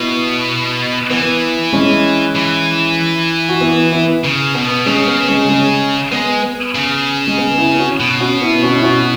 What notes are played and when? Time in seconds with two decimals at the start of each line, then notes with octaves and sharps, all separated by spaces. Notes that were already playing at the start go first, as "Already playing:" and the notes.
Already playing: B2 B3 E4
1.10 E3 B3
1.73 G#3 C#4
2.35 E3
3.49 F#4
3.61 B3 E4
3.92 B3 E4
4.24 C#3
4.54 B2 B3
4.86 C#3 G#3 C#4
5.07 B3
5.28 G#3 C#4
5.49 G#3 C#4
6.12 G#3 B3
6.43 B3
6.75 C#3
7.27 G#3
7.38 B3
7.58 B3 E4
7.79 C#4 F#4
8.00 B2
8.20 C#4 F#4
8.41 B3 E4
8.63 C#4 F#4
8.78 E4
8.83 C#4 F#4